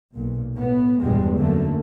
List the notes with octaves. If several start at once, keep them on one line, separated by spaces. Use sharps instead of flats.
B1 A#2
A2 B3
G1 E2 G2 A#2 G3 G#3
F#2 D3 A3 A#3